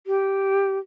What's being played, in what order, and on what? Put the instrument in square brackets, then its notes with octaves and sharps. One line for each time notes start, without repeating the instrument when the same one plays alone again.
[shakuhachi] G4